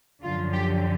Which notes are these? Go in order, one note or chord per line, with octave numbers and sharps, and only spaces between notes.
F#2 D3 F3 F4
G4